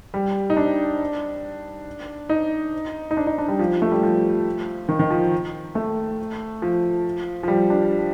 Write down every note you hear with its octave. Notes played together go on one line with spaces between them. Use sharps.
G3
D#4
D4
D#4
D#4
D4
D#4
D4
G3
F3
A3
G3
F3
D#3
D#3
F3
A3
F3
F3
G3
D4